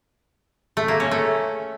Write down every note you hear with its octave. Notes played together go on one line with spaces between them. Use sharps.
A3
A#3
C#4
A3